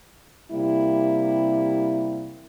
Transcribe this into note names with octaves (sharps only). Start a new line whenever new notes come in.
C3 G3 A#3 E4